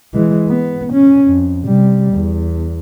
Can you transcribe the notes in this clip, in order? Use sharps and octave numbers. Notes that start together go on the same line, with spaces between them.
E3 G#3
B3
C#4
F2
C3 G3
E2